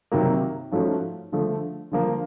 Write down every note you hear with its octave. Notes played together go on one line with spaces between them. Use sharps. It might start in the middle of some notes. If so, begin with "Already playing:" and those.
C3 D#3 F#3 A#3
G#2 F3 A3 C#4 F#4
D3 F3 A3
D3 F3 A#3